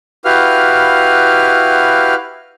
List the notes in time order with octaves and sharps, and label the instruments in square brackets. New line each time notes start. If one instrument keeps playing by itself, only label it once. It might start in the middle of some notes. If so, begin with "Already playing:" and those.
[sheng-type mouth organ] E4 F#4 G4 B4 F5 F6